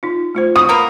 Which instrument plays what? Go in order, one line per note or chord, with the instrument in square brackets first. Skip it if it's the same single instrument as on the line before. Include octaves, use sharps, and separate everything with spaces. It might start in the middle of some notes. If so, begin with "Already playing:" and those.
[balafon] D#4 F4
A3 F4 C5
[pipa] F#4 [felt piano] D#6
[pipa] A#3 B3 A#4 [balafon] B5